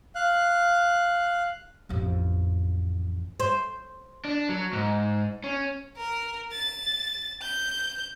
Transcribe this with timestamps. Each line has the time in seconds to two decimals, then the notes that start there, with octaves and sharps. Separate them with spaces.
0.15 F5 F#6
1.89 A1 F2
3.40 C5
4.25 D4
4.49 F#3
4.73 G#2
5.44 C#4
5.97 A#4
6.52 A6
7.42 G6